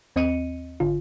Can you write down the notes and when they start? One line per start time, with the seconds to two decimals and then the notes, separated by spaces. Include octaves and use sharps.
0.16 D#2 C4 D#5 C#7 D#7
0.80 G#1 D3 F4